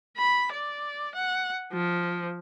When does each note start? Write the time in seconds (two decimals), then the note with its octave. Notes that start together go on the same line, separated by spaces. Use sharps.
0.18 B5
0.52 D5
1.15 F#5
1.73 F3